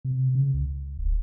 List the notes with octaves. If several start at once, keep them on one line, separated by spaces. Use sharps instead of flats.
C3
C#3
C#2
D1